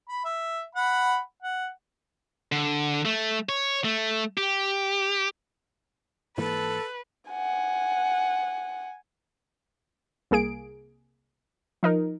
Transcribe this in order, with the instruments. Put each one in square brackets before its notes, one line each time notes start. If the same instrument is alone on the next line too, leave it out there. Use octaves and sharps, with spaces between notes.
[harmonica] B5
E5
F#5 B5
F#5
[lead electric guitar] D3
A3
C#5
A3
G4
[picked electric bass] G#2 E3 A#3 [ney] A4 [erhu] B4
[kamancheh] F#5 G#5
[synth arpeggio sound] C2 A#3 G#4 D7
F3 D#4 A#4